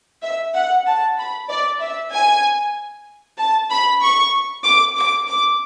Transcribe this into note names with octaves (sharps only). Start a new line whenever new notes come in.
E5
F#5
A5
B5
D5
E5
G#5
A5
B5
C#6
D6
D6
D6